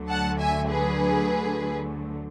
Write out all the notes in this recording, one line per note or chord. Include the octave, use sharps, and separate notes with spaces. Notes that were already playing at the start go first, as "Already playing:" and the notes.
Already playing: D2 D3 F#3 A3
F#5 A5
E5 G#5
G#4 B4